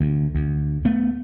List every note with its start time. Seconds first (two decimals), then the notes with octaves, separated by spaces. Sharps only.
0.01 D2
0.35 D2
0.85 A3 B3